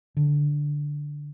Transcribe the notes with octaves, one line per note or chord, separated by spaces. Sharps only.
D3